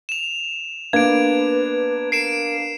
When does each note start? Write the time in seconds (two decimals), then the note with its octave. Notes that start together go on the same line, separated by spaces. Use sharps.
0.09 E7 F7
0.93 A#3 B3 D4 B4 G#6 D7
2.12 A#4 C7 D7 E7